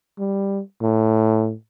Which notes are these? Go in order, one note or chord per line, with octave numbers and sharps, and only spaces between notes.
G3
A2